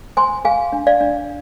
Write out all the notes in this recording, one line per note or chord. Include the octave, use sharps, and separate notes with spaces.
C5 G#5 C6
G#4 F5 G#5
D4
D5 F5
D4